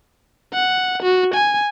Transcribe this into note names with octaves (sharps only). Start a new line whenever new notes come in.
F#5
F#4
G#5